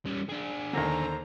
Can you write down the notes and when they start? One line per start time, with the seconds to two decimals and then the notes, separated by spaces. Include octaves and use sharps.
0.06 G3 C#4
0.29 D4 G#4
0.73 D#2 D3 A4 C5 A#5